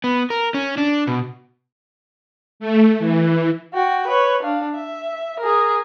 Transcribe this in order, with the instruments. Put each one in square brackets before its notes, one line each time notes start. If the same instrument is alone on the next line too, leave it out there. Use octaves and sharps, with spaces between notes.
[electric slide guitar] B3
A#4
C#4
D4
B2
[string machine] A3
E3
[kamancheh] F#4 G5
B4 C#5
D4 F5
E5
G#4 A#4